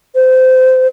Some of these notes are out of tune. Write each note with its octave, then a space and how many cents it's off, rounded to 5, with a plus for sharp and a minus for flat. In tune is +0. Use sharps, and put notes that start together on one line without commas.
C5 -20